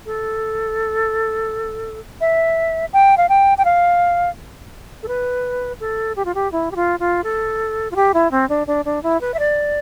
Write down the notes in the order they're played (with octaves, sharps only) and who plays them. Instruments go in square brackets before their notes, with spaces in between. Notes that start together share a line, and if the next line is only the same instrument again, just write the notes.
[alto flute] A4
E5
G5
F5
G5
G5
F5
A4
B4
A4
G4
F4
G4
E4
G4
F4
F4
A4
F4
G4
E4
C4
D4
D4
D4
E4
B4
E5
D5